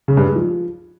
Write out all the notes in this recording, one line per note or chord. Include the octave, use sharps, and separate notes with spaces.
C#3
G2
G#3
F3